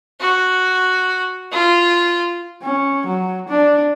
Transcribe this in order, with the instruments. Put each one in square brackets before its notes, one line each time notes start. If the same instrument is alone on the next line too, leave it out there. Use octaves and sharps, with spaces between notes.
[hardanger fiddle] F#4
F4
[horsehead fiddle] C#4
F#3
D4